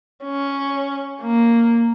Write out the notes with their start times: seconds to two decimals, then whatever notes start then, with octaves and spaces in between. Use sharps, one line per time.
0.24 C#4
1.22 A#3